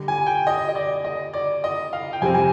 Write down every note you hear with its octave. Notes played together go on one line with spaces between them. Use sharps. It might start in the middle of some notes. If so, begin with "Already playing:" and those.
Already playing: D3 G3 D4
G#5
G5
D#5
D#5
D5
D#5
D5
D#5
F5
G5
F2 C3 G3 C4 G#5
G#5